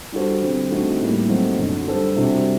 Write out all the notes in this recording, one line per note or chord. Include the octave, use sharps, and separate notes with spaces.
G3 D4 F#4 A4 C5
D3 G3 C4
D3 A3 C4 D#4 F#4
A2 G3 A#3
F#3 A3 C4 D#4 A4
F#2 D3 F#3
G3 D4 A4 C5
C3 G3 D4 F#4